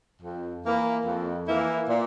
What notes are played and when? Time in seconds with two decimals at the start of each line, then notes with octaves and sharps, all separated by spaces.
0.22 F2
0.63 E3 A#3 E4
1.06 F2
1.47 E3 A#3 E4
1.89 A#2